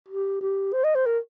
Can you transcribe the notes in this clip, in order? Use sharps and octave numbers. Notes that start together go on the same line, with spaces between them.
G4
G4
C5
D#5
C5
A#4